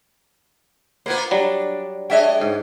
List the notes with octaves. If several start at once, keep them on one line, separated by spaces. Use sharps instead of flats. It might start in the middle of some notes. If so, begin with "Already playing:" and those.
A#3 B3 F4 C5
F#3 G3 D4
G#3 D4 C#5 D#5 E5 G5
G#2